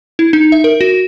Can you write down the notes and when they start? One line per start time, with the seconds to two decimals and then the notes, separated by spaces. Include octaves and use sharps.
0.19 E4
0.33 D#4
0.52 E5
0.64 A#4
0.81 F#4